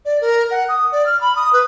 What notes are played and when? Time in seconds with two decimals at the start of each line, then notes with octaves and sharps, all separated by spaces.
0.05 D5
0.21 A#4
0.51 F#5
0.69 D#6
0.92 D5
1.06 F6
1.21 B5
1.36 D#6
1.53 B4